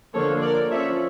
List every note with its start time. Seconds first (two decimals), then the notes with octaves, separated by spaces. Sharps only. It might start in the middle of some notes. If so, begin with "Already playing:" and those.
0.14 D3 F3 A#3 A4 C#5
0.42 A#4 D5
0.70 F3 C#4 C#5 E5